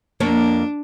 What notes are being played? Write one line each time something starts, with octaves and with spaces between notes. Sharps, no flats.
F2 A#3 D4 C#5